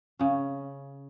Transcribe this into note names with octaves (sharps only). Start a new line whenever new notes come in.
C#3 C#4